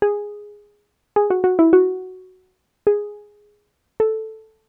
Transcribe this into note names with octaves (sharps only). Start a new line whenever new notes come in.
G#4
G#4
F#4
F#4
E4
F#4
G#4
A4